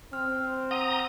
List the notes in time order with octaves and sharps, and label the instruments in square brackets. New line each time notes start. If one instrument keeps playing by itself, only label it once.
[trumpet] C4 [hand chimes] F6
[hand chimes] F#5 [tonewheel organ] A#5 D#6